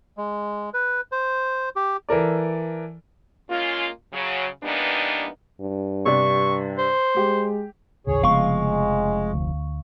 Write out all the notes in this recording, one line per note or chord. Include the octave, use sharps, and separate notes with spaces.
G#3
B4
C5
G4
E3 A4 A#4 D5
G#3 A#3 C#4 F4
C#3 F#3
E3 G3 A#3 B3 D4 D#4
G2
C3 D4 C#6
C5
G#3 G4
A1 D#2 C#3 G#4 C#5
F1 C#3 F3 G#3 B3 F5 C#6
D2